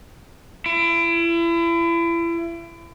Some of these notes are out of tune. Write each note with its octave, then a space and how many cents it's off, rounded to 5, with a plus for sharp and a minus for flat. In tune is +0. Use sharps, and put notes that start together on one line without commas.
E4 +35